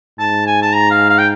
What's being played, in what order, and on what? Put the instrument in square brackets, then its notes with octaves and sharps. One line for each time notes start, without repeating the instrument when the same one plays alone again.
[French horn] G#2 [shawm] A5
[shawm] G#5
A5
A#5
F5
F5
G5